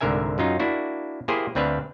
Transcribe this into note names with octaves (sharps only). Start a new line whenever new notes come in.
C2 G#2 D3 A#4 E5 G#5
F#2 F#3 D#4 F4
A#3 D4 E4 F#4
A#3 E4 G4 G#4 C5
D2 C4 D4 B4 E5 F5